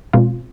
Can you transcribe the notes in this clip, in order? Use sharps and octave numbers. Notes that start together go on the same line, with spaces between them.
B2 G#3 C4 F4